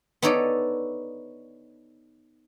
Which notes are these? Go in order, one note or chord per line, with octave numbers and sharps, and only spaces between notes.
B3 D#4 A4 C#5 D5